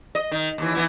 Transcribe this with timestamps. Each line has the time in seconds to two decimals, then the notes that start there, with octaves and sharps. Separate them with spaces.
0.15 D#5
0.31 D#3
0.58 D#2 E3
0.75 E3 B3 E4